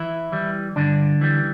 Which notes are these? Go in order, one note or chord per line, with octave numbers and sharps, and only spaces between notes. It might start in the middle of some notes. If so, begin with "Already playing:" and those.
Already playing: E3 E4
E3 G3
G2 D3 D4
E3 G3